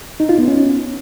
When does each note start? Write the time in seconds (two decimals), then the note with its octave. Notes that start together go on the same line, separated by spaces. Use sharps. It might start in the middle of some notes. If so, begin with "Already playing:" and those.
0.20 D#4
0.29 F4
0.38 B3
0.48 C#4